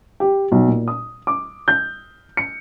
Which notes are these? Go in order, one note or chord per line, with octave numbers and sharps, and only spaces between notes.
G4
B1
A#2
D#6
D6
G6
C#7